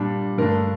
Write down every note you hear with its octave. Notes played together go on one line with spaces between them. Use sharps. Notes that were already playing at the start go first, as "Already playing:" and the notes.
Already playing: A#2 G3 D4
G2 D3 A3 D4 A#4